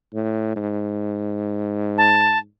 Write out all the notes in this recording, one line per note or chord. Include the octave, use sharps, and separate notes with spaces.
A2
G#2
A5